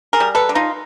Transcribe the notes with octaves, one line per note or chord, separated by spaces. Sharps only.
G#4 A#4
G3
A4 B4
D3
D#4 F4